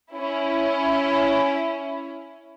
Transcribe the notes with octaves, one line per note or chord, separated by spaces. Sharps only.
C#4 E4